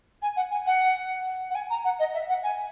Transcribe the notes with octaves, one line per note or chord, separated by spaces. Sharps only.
G#5
F#5
G#5
F#5
F#5
G#5
A#5
F#5
D#5
E5
F#5
G#5